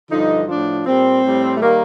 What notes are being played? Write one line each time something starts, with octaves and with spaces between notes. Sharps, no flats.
G2 D3 F3 D#4
A2 F3 D4
A#2 G3 C4
A2 G3
A3
D#3 G3 A#3